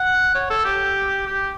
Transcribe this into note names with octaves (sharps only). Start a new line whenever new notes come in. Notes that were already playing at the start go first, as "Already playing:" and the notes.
Already playing: F#5
C#5
A4
G4
G4